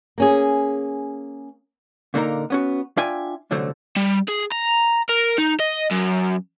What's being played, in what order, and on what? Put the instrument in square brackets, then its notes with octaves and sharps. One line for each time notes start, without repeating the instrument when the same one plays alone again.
[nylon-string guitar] A#3 C#4 G#4
[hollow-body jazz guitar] A#2 D3 A#3 D#4 A#4 A#5
B3 C#4 F#4
D4 F4 E5 G5 G#5
C2 F#2 D3 F#3 A3 C5
[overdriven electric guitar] G3
G#4
A#5
A#4
D#4
D#5
F#2